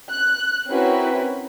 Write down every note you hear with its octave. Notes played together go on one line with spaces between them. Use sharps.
F#6
C4 C#4 E4 F#4 A#4 B4